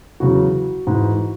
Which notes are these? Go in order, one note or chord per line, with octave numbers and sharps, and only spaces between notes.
E2 C#3 F#3 F#4
G#2 E3